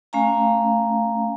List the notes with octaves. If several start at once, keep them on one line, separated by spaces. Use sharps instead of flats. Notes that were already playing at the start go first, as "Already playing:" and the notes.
A3 C#4 F5 G#5 A#5